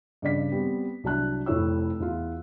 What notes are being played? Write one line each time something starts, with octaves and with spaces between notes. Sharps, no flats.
G2 C#3 D5 B6
G3 B3 C4 G4
C2 F#3 D4 A5 F#6
F1 F2 E4 C#5 E6
E2 F4